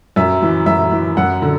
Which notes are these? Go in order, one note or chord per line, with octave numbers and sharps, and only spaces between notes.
F#2 E5
E3
F#2 E5
E3
F#2 F#5
D3